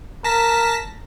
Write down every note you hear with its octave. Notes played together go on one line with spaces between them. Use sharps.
A#4 A5 A#6 B6